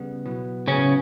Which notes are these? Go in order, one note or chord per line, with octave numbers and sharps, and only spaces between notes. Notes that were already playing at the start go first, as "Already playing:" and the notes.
Already playing: C#3 G3 B3
B2 F#3 B3 E4
A2 C#3 F#3 B3 C#4 E4 B4